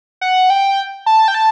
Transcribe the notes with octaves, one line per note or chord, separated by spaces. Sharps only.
F#5
G5
A5
G5
A5